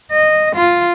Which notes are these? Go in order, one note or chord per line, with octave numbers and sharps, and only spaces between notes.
D#5
F4